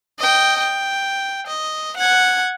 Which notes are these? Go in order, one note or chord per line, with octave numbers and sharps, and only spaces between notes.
D#5 G5
G5
D#5
F#5 G#6